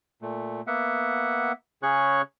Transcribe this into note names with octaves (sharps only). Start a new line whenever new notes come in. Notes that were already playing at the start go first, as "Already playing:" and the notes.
A#2 A3
A#3 B3 E5 F#5
C#3 C#4 G#4 C#5 C#6 F#6